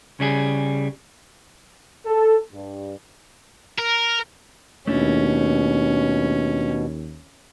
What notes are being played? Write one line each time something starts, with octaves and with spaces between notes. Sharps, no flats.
C#3 G3 G#4
A4
G2
A#4
D#2 B2 A3 C#4 D4 E4